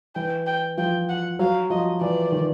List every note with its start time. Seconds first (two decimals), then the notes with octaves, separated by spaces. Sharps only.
0.15 E3 G5
0.47 G5
0.78 F3 G5
1.09 F#5
1.39 F#3 F5
1.70 F3 D#5
2.01 E3 D5
2.32 D#3